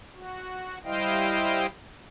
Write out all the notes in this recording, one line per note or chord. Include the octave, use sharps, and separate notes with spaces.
F#4
G3 E4 C5 D#5 F5 G5